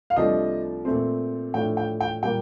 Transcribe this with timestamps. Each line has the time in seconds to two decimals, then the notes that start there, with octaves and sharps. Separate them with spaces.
0.10 F5
0.16 C2 C3 F3 A3 D4 D#5
0.85 A#2 A3 C4
1.54 A2 F3 A3 D4 G5
1.77 G5
2.01 G5
2.23 A#2 G3 A#3 G5